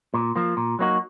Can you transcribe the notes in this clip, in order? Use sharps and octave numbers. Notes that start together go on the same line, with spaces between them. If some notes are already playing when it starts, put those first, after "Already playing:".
A#2
F3 A#3
A#2
F#3 A#3 D#4 F#4